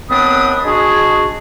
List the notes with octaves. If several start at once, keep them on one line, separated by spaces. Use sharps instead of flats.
D#2 B3 C4 D4 B4 D#6
G#3 D4 F#4 G#4